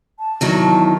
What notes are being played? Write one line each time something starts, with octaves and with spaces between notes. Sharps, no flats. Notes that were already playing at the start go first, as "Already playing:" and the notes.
A5
E2 D#3 F#3